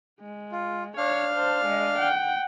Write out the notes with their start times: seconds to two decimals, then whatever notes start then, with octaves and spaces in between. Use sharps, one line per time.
0.20 G#3
0.52 F4
0.97 D4 C#5 F5 F6
1.34 C5 A5
1.65 G#3 D#5
1.98 F#5 G5